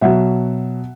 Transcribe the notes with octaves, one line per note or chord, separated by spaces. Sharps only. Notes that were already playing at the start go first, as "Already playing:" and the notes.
B2 F#3 E5 F#5